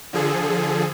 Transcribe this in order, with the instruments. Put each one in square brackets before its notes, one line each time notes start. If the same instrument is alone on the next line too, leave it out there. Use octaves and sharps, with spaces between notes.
[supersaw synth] D3 F3 G#4 A4